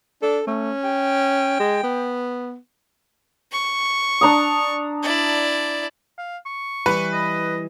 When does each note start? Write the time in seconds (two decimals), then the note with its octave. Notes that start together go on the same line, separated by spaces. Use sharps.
0.22 D4 A4
0.47 A3 C#4
0.84 G5
1.59 G#3
1.83 B3
3.52 C#6
4.21 D4 A#5 D#6
5.03 E4 D5
6.18 F5
6.46 C#6
6.86 E3 G3 B4
7.13 D#5